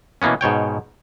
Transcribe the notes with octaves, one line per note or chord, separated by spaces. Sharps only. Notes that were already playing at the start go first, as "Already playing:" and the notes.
B2 E3 A#3 B3 C#4
G#2 B2 C#5 G5